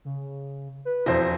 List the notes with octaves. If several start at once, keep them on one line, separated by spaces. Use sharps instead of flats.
C#3
B4
E1 F2 C5 A#6